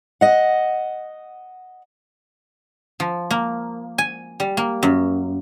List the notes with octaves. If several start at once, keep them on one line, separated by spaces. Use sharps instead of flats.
D#5 F#5
F3
A#3
G#5
G3
A#3
F#2